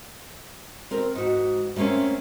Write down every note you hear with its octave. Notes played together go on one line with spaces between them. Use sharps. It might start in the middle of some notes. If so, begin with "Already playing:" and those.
C4 A#4
G#2 F#4
G3 A3 A#3 C4 C#4